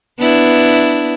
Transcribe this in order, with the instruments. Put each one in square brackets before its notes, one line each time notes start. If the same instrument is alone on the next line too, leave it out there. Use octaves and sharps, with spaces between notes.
[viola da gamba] B3 D4 E4